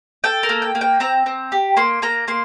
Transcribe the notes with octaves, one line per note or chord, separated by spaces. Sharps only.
A4 G5
A#4
A#3
G5
A#3
G5
C4 A#5
C4
G4
A#3 C6
A#3 A#5
A#3 C6